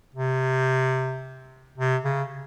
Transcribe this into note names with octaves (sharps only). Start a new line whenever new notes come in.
C3
C3
C#3